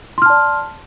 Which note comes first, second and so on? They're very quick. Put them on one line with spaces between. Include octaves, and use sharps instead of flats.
C6 F6 A5 D5